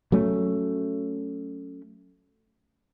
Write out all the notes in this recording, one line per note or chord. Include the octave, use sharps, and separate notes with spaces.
F#3 A3 C#4